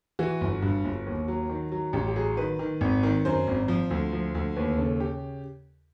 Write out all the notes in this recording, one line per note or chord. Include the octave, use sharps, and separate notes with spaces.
E3 F#4
G1
G2
G1
D#2
F#3
D#3
F#3
A1 G4
G4
F#3 G#4
D#3 B4
D#3
G#1
D#3
F#2 C5
G#1
F3
D2
F3
D2
D#2 B4
C#3 A4
C#3 G4